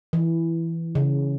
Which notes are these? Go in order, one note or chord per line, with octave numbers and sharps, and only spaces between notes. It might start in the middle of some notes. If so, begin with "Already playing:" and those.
E3
C#3